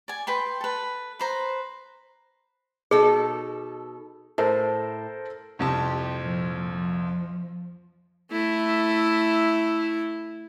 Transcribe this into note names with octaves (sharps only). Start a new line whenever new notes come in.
D5 G#5
B4 G5 C6
A4 B4
B4 C5 A#5
B2 D#4 G#4 A4
A2 A4 A#4 C5
C2 F2 G4 A5
A#2 F3
F3
A3 E4